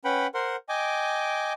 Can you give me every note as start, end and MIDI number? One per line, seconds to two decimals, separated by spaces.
0.05 0.27 61
0.05 0.27 71
0.05 0.27 78
0.05 0.27 79
0.05 0.27 83
0.34 0.56 70
0.34 0.56 72
0.34 0.56 78
0.34 0.56 84
0.69 1.53 75
0.69 1.53 79
0.69 1.53 80
0.69 1.53 86